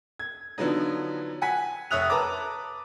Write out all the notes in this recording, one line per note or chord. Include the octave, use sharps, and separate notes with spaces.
G#6
D3 F3 F#3 B3 D#4
F#5 G#5 B6
F1 C#5 E5 D#6 F#6 F7
B4 A5 A#5 D6